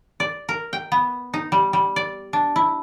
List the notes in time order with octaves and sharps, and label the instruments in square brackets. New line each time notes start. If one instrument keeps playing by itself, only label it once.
[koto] D5
A#4
G5
B3
D#4
G3
G3
D5
D4
E4